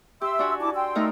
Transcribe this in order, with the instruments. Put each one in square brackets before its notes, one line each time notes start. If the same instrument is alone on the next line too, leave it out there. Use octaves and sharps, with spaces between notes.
[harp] G4 [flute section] E5 C6 E6
[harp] D4 F#4 G#5
[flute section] E4 A5 D6
G5 C6 E6
[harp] A3 D#4 A#4